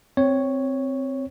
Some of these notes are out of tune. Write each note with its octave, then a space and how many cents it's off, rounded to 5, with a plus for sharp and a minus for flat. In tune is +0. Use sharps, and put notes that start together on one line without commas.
C4 +0 C#5 +0